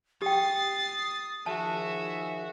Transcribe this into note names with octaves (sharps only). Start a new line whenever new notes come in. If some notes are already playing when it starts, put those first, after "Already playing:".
G4 G5 D#6 A6 C7
D#3 F3 F#4 G#4 E5 A5